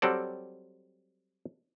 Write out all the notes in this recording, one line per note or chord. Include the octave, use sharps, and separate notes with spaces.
F#3 G3 C4 A4 D5